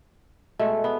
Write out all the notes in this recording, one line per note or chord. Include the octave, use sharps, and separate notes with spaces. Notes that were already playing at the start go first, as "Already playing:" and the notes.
B2 G#3 A3
B3